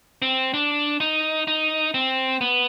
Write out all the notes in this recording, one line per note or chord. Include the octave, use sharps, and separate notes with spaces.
C4
D4
D#4
D#4
C4
B3